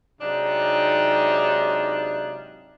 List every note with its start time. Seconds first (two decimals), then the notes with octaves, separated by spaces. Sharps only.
0.21 G#2 C3 F#3 D4 D#4 F4